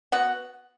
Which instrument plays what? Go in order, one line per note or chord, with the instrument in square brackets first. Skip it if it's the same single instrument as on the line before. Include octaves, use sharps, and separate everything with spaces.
[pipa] B3 F#4 F#5